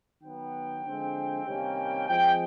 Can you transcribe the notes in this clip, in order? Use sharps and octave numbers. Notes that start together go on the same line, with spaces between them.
D#3 F#3 B3 G5
D3 F3 G#3 C4
C3 D#3 G3 A#3 C#4
F3 G#3 C4 G5